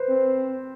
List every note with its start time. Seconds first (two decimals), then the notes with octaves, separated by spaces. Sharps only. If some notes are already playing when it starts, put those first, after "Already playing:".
Already playing: B4 C5
0.09 C4